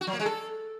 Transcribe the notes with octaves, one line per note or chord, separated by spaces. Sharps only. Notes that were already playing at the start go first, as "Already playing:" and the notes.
F#4
F#3
A#3
G#3
A4